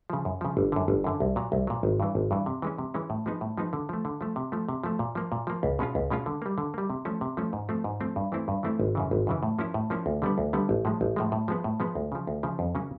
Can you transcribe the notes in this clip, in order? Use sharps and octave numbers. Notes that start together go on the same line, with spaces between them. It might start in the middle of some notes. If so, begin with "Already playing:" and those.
C#3 F3
F#2
C#3 F3
G1
F#2 D3
G1
F#2 D3
C2
A#2 F#3
C2
A#2 F#3
G#1
G2 E3
G#1
G2 E3
C3
E3 G#3 C#4
C3
E3 G#3 C#4
A2
F3 G#3 B3 D#4
A2
F3 G#3 B3 D#4
D3
F3 A3
D3
F3 A3
C3
F3 A3
C3
F3 A3
A#2
F3 A#3
A#2
F3 A#3
C#2
B2 G#3 C#4 F4
C#2
B2 G#3 C#4 F4
D3
G3 A#3
D3
G3 A#3
C3
F3 A3 C#4
C3
F3 A3 C#4
G#2
F3 A3 C4
G#2
F3 A3 C4
G2
E3 A3 C4 E4
G2
E3 A3 C4 E4
G#1
F#2 C#3 E3
G#1
F#2 C#3 E3
A2
F3 A#3 C#4 E4
A2
F3 A#3 C#4 E4
D2
D3 G3 B3
D2
D3 G3 B3
A1
A2 F3 G#3
A1
A2 F3 G#3
A2
F3 G#3 B3
A2
F3 G#3 B3
D2
C#3 F3
D2
C#3 F3
F2
C#3 F#3 A#3 C#4